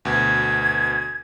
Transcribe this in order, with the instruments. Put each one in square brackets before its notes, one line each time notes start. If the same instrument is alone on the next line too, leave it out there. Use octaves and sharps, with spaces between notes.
[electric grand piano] D2 B2 [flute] G#6